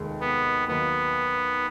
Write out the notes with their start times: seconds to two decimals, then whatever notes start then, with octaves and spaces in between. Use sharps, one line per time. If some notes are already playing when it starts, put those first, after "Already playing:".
Already playing: F1 D#2 D#3 G#3
0.20 B3
0.68 D#2 D#3 F#3 A#3 B3